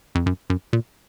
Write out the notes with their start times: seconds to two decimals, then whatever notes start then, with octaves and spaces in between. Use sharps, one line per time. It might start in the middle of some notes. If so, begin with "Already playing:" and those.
0.15 F2
0.26 F#2
0.50 F#2
0.73 A#2